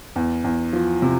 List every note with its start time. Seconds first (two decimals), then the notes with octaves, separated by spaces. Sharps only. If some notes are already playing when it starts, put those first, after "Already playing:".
0.16 E2
0.44 E2
0.73 F3
1.02 C3